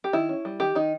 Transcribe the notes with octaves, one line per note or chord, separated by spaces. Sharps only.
G4
D#3 E4
C#4
G3
D#3 G4
D#3 D#4